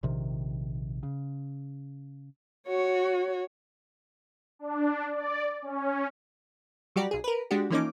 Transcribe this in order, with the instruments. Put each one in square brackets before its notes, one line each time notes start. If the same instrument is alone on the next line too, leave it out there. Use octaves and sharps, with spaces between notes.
[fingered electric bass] A#1 C3 D#3
C#3
[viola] F#4 C#5
[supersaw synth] D4
D5
C#4
[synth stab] F#3 G3 F#4 G4 D5
B1 G#4
A#4 B4
G#3 D4 F#4 G4
E3 F3 A#3 C#4 D#4 D6